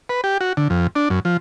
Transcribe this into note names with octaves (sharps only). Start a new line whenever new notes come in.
B4
G4
F#4
D3
F2
D4
F#2
F3